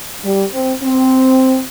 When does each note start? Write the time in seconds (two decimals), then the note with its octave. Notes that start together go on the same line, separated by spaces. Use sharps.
0.24 G3
0.52 C4
0.81 C4